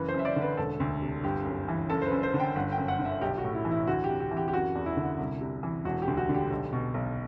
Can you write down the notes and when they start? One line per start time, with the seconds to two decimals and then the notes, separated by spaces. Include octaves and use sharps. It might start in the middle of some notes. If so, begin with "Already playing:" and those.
Already playing: F#1 E3 B4
0.08 C5
0.14 F#2 E5
0.25 D5
0.36 D3
0.41 B4
0.57 E1 A4
0.80 D2
1.02 C3
1.24 G1 G4
1.45 F#2
1.68 E3
1.89 F#1 A4
2.02 C5
2.06 B4
2.11 F#2
2.23 C5
2.34 D3
2.40 G5
2.55 G1 F#5
2.72 G5
2.78 F#2
2.88 F#5
2.99 D3
3.05 E5
3.21 B1 G4
3.38 F#4
3.44 A2
3.55 E4
3.65 E3
3.71 E4
3.87 D2 F#4
4.04 C3 G4
4.20 G4
4.31 E3
4.37 G4
4.48 G4
4.53 F#1 F#4
4.75 E2
4.86 E4
4.97 D3
5.19 C2
5.41 C3
5.63 E3
5.85 E1 F#4
6.02 G4
6.07 D2
6.17 F#4
6.29 D3
6.34 G4
6.50 B1
6.73 B2
6.94 B1